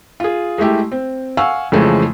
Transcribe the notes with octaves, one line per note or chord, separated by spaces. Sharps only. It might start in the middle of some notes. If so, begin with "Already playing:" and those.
F4 G#4
G#3 A3 E4 G4
C4
F5 F#5 G#5 C#6 E6
F2 C#3 E3 F3 G#3 A3